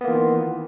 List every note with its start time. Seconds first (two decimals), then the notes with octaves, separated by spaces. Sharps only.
0.01 B3
0.04 A#3
0.07 E3
0.11 F4
0.14 D#3